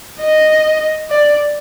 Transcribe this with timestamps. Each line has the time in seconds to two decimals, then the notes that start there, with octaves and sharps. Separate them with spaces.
0.21 D#5
1.11 D5